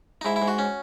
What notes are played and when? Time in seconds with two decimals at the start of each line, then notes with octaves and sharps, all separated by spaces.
0.21 D#4
0.25 G#2 E4
0.36 E4
0.42 G#2
0.48 F#4
0.59 C#4